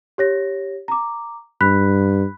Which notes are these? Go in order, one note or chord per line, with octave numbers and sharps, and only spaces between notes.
G4 C#5 A#6
A#5 D6
G2 B5 F#6 B6